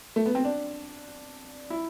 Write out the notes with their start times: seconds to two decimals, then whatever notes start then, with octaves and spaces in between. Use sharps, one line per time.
0.16 A3
0.26 B3
0.35 C4
0.45 D4
1.70 E4